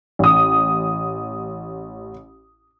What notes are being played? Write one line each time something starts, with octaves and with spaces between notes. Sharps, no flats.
A1 D#6